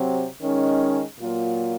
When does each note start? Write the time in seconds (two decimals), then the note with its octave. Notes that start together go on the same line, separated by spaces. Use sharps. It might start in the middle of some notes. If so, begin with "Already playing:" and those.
Already playing: C3 F#3 C4
0.40 D#3 G#3 C#4
1.18 A#2 F#3 A#3 F4